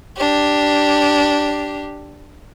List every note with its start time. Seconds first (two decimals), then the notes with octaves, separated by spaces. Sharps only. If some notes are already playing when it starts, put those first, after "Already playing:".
0.17 D4 G4